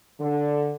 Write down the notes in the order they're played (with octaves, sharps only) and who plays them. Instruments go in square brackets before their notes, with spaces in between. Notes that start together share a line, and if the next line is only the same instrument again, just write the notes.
[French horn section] D3